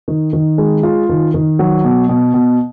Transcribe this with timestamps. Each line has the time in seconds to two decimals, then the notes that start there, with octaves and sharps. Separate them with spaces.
0.08 D#3
0.33 D#3
0.58 G#3
0.83 F4
1.09 D#3
1.34 D#3
1.59 F#3
1.84 B2
2.09 B2
2.34 B2